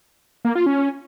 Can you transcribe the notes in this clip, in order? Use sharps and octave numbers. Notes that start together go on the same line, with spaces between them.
A#3
F4
C#4